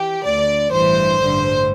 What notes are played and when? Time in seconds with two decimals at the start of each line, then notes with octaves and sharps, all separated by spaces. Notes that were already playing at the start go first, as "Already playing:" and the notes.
Already playing: E3 G4
0.25 D2 D3 D5
0.71 A1 G2 E3 C5
1.20 A1 G2 D3